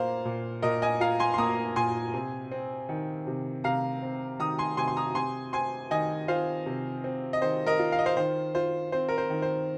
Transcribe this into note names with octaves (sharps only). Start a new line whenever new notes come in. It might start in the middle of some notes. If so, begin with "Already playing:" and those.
Already playing: A#2 A#3 F4 C5 F5 A#5
A#2
A#2 A#4 D#5
D#5 G#5
F4 F5 A#5
G#5 C6
C6
A#3 A#5 D#6
A#2 G#5 C6
C3
C4
D#3
C3
C3 F5 A#5
C4
D#3 A#5 D#6
G#5 C6
C3 G#5 C6
C6
A#5 D#6
C3 G#5 C6
C4 G#5 C6
D#3 D#5 G#5
F4 C5 F5
C3
C4
D#5
D#3 C5
A#4 D#5
F4
F5
D#5
C5 F5
D#3 C5
F4 C5
C4 C5
A#4
C5
D#3
C5